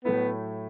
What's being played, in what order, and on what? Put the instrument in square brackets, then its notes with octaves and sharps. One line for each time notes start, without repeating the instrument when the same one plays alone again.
[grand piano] A2 F#3 A3 E4 [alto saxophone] B3